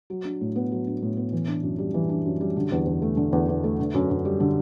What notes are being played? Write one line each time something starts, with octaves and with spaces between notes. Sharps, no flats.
F#3
D4
A2
B3
F#3
D4
A2
B3
E3
D4
F#2
G3
E3
D4
F#2
G3
D3
E2
E2
A3
D3
E2
E2
A3
D3
F#2
F#2
G3
D3